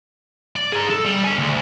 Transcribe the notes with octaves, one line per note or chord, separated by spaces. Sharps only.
D5
G#4 A#5
A4
G3
D4 G#5
D2